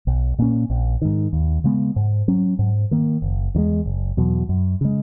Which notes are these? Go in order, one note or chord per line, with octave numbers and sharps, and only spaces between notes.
B1
A#2 A#3 C#4
A#1
G#2 D#3
D#2
C#3 G#3 B3
G#2
F#3 C#4
G#2
D#3 A#3
F#1
E2 D#3 G#3
F#1
E2 B2 F#3
F#2
C#3 G#3